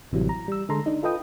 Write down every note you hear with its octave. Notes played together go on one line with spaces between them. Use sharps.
A1 C3 E3 F#3 G3
A#5
G3 E6
D3 G#3 A4 A#5 C6
D4 D#4
F4 A4 B4 D#5 G5 D#6